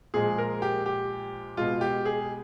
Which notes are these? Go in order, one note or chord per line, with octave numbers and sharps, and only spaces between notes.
A#2 F3 G#3 G#4
A#4
G4
G4
B2 G#3 F4
G4
G#4